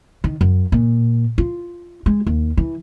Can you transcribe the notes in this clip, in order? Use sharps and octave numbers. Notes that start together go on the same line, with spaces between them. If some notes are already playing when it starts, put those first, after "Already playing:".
D#3
F#2
A#2
F4
G#3
D#2
E3